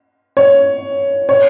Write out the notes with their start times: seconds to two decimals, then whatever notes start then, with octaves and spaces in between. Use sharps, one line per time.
0.37 C#5
1.29 C#5